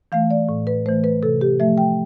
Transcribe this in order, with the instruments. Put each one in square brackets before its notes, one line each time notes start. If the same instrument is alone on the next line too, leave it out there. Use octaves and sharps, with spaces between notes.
[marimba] E3 A3 F5
D5
A2
B4
A3 C5
E3
B4
C3 A4
G4
F3 A3 E5
G5